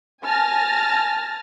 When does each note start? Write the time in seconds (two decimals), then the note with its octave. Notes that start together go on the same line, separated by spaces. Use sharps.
0.23 G#5 A5 F6 A6 A#6